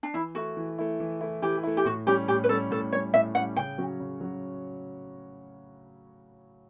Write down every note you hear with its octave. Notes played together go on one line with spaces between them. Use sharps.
D4
E3 E4
A3 E4 F#4
E3
A3 E4
E3
A3 E4
E3 G4
A3 E4
G4
A2 F#4
G3 C#4 G4
A2 G4
B4
G3 C#4 A4
A2 A4
G3 C#4 C#5
A2 E5
G3 C#4 F#5
C#3 G5
F#3 C#4 F#4
C#3
F#3 C#4 F#4